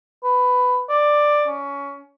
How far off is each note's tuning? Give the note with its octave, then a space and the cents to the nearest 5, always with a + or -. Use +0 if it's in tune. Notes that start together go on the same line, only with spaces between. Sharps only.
B4 +10
D5 +10
C#4 +20